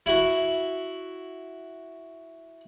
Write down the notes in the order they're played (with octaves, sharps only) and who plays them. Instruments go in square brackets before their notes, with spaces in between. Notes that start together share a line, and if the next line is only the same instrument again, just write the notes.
[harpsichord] E4 F#4